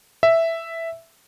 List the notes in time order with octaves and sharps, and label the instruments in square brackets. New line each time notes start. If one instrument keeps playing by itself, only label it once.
[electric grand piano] E5